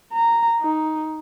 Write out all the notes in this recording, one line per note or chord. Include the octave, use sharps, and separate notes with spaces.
A#5
D#4